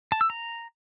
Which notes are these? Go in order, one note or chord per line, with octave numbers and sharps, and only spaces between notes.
A5
E6
A#5